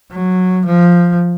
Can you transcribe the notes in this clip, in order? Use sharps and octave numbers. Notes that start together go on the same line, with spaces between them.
F#3
F3